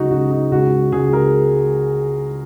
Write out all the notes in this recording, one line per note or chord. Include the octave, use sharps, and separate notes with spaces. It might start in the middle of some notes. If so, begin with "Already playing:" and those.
Already playing: C#2 C#3 F#3 D#4 F#4
C#2 C#3 F#3 F#4
D#4
C#2 C#3 G#3 F#4
C#2 C#3 G#3 G#4
A#4